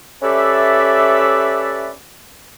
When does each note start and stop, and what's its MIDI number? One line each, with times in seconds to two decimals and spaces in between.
0.23 1.91 61
0.23 1.91 67
0.23 1.91 69
0.23 1.91 71
0.23 1.91 74
0.23 1.91 76